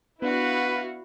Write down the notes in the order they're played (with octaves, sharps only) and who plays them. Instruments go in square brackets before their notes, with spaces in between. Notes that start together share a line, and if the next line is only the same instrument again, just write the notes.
[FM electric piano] B3 D4 [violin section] E4 F#4 F5 [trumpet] B4